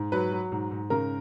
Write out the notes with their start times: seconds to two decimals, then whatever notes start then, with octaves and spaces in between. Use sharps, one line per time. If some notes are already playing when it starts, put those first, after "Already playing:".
Already playing: G#2
0.12 F#3 B4
0.32 F#3
0.52 G#2
0.71 G#2
0.90 C#3 A#4